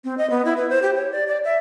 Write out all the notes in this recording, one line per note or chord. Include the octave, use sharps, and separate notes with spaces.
C4
D#5
B3
E4
B4
C5
G4
C#5
D5
D5
E5